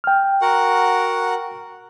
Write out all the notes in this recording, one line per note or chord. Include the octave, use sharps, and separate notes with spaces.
G5 F6
F#4 A#4 F#5